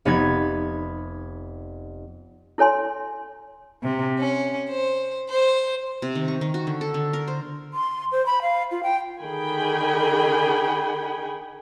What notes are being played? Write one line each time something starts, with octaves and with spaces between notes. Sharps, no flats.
F1 B3 D#4 B5 G#6
E4 A4 C#5 G#5 C6
C3
C#4
C5
C5
C3
D#3
C#6
D#3
F#4
D3
A4
D3
A#4
C5
C6
C5
B5
F5
F4
G5
D3 D#3 G#4 G5 G#5 B5